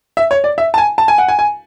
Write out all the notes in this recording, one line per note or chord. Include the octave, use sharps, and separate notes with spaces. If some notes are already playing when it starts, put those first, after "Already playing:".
E5
C#5
D5
E5
A5
G#5
A5
G#5
F#5
G#5
G#5